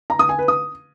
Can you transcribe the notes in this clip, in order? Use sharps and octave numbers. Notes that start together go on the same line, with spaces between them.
A#5
D#6
G#5
B4
D#6